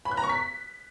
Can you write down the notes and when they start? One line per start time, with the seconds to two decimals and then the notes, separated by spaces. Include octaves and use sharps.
0.05 B5
0.11 F#6
0.17 A#5
0.23 C#6
0.29 B6